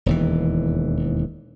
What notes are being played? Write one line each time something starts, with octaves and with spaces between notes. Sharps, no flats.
E1 D#2 E3